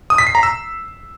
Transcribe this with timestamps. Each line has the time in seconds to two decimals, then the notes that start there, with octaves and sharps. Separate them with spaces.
0.10 D#6
0.18 B6
0.27 C7
0.35 A#5
0.43 E6